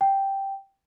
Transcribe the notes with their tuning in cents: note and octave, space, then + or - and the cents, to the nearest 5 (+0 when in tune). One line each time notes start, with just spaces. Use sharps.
G5 -5